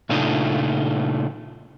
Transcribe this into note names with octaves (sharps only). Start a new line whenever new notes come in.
A#2 C#3 A3 D4 D#4 F4